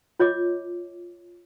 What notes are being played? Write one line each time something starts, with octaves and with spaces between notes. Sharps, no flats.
F4 C#5 D#5 D6